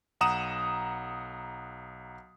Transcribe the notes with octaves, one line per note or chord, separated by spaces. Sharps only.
B1 F#5 A#5 D#6 E7